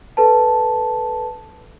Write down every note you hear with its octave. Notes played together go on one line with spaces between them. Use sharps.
A4 B4 A5